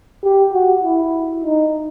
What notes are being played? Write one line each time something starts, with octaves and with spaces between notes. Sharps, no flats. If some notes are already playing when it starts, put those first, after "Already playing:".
G4
F#4
E4
D#4